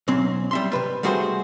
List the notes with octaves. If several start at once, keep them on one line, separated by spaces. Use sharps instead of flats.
B1 F#3 C4 C#4
G3 E5 C6
C3 B4
G3 A3 F#4 G#4 B4 C5